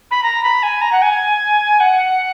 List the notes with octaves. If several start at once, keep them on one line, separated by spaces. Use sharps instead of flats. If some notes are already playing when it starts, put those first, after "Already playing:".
B5
A#5
B5
G#5
A#5
F#5
G#5
F#5